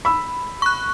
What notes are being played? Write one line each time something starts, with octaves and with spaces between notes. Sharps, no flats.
B5 E6
C#6 F#6